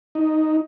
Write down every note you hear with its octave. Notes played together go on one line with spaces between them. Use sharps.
D#4